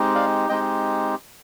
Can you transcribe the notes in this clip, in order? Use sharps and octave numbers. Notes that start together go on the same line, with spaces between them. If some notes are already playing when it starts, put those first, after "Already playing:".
Already playing: G#3 C4 D#4 G4
D5 F5
G#3 C4 D#4 G4 D#5 G5